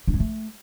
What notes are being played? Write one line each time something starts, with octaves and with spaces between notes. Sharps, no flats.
D4
C#4
A3